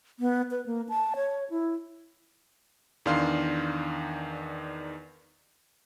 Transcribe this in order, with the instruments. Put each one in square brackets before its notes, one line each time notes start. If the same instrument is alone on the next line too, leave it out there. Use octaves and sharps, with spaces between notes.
[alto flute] B3
B4
A#3
A5
C#5
E4
[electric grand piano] E2 D#3 D4 F5 C6